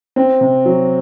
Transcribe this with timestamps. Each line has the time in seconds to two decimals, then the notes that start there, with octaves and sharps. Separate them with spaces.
0.16 C4
0.41 C3
0.66 F#3